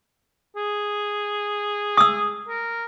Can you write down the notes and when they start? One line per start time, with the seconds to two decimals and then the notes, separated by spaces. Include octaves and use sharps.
0.56 G#4
1.97 D#6 E6
2.48 A#4